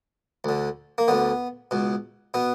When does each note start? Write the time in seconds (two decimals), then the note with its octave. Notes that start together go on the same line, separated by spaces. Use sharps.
0.44 D2 D3
0.98 A#3
1.08 D2 D3 B3
1.71 C#2 B2
2.34 B2 B3